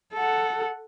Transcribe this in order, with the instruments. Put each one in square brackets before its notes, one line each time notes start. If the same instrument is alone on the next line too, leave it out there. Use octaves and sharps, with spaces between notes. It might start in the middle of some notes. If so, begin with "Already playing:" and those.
[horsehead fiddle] A4 F#5